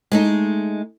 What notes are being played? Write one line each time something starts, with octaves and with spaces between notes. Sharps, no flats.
G#3 A3 D#4